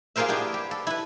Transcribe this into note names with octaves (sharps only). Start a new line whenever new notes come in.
F4 G4 G#4 A#4 C5 E5
B3 D4 E4 G4
G4
A4
E4 B4